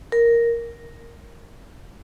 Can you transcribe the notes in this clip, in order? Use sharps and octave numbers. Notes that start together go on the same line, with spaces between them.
A#4